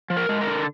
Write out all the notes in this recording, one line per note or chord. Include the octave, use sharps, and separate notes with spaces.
F3
A#4
G#3
A#4
D3